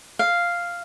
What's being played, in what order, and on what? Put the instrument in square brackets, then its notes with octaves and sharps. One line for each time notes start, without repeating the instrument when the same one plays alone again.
[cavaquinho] F5